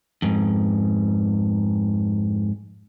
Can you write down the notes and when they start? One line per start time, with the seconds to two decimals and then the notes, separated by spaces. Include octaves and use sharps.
0.22 F2 G#2